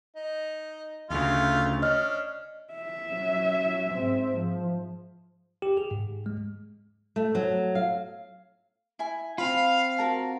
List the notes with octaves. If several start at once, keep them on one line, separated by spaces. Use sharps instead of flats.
D#4
D2 C#3 A3 F4
C#4 D4 D#5 F6
E5
F#3 C#4
G#2 C4
F3
G4
G#4
G#2
G#3
A3
F#3
F5
E4 G#5
C4 F4 F5 B5
F#4 A#4 A5